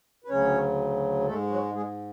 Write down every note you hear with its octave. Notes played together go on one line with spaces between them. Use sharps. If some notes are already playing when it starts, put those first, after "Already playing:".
B4
D2 C#3 F#3 C#4 C#5
G#2 G#3 A3 A4
F#3 F#4
G#3 G#4